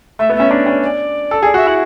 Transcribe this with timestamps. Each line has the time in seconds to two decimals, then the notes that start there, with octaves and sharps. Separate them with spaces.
0.19 A3 E5
0.30 B3
0.35 C#4 E5
0.50 D4 D5
0.66 C#4
0.82 D5
1.31 A4
1.42 G#4 D5
1.54 F#4 E5
1.66 E4 F#5